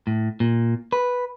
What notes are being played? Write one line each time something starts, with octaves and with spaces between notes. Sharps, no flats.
A2
A#2
B4